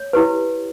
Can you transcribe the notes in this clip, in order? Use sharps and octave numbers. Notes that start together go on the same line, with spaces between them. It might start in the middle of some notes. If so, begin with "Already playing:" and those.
Already playing: C#5
E4 G4 B4